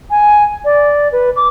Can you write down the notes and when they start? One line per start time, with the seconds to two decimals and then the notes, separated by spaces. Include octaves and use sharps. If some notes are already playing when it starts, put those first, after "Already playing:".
0.10 G#5
0.65 D5
1.12 B4
1.36 D6